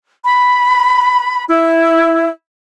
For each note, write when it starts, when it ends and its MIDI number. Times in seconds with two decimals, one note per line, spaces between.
0.24 1.44 83
1.49 2.28 64